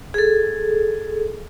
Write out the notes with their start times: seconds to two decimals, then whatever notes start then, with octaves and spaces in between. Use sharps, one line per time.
0.14 G#4 A4